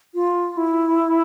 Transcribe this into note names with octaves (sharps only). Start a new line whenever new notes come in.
F4
E4